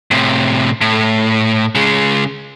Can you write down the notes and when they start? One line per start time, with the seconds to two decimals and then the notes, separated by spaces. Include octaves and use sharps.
0.11 A2 C3
0.81 A2
1.75 C#3 G#3